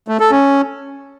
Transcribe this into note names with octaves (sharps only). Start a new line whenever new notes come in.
A3
A4
C#4